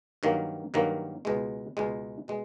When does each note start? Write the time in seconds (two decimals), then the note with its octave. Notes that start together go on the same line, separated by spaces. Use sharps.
0.23 G2 D#3 F#3 A#3
0.74 G2 D#3 F#3 A#3
1.25 C#2 B2 G#3
1.77 C#2 B2 G#3
2.28 B2 G#3